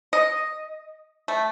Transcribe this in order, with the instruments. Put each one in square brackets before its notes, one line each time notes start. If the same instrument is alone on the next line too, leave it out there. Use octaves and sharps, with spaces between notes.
[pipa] D#5
A3